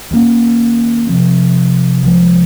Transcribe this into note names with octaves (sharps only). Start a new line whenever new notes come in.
D#2 D#3 A#3 C#4
C3 F3 C4
C2 C3 F3 G#3